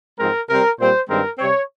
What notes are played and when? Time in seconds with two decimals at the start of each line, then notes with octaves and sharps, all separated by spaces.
0.18 G#2 F3 G#3 C4 A#4
0.48 C3 G3 C4 A#4
0.78 A#2 G3 C4 C5
1.09 G2 D#3 G#3 C4 A#4
1.39 C3 G3 C4 C#5